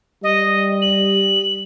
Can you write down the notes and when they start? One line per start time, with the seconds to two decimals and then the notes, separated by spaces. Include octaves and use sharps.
0.23 G3 D#5
0.82 F#7